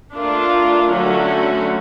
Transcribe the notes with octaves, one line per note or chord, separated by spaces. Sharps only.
A3 D4 F4 A#4
D3 F#3 A3 C#4 F#4